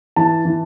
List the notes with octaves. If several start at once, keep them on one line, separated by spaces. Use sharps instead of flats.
E3 A5
E3